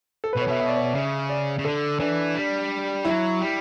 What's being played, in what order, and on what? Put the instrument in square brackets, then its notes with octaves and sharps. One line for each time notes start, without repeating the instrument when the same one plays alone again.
[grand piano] A4
B4
[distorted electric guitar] B2
[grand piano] C#5
[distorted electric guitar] B2 [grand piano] E5
[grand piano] E5
D5
C#5
D5
[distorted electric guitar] C#3 [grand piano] E5
[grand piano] D5
[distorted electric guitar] C#3
[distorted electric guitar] D3 [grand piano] A4
[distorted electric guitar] E3 [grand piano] D4
[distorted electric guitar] G3
[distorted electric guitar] F#3 [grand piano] E4
[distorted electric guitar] G3